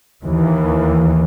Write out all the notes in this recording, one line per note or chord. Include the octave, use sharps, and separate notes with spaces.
D#2 E3